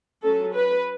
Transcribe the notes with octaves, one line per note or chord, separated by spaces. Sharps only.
F#3 C#4 A4
B4